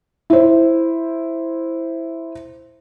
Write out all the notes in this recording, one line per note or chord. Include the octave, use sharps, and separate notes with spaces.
E4 C5